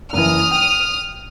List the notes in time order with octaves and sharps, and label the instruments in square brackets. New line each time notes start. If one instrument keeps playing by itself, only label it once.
[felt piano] F#1 E3 [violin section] D#6 F6
[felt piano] G5